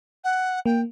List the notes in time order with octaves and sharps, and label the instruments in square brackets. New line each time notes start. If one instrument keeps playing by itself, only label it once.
[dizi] F#5
[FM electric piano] A#3 [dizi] G5